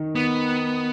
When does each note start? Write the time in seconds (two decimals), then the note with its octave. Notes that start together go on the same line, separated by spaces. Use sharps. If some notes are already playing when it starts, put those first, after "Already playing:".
Already playing: D#3 D#4
0.15 B3